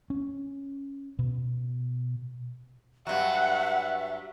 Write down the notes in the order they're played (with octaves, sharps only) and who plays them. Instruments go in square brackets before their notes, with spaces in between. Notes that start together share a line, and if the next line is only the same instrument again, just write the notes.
[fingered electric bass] C#4
B2
[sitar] G2 F#3 [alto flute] E5 [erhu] F#5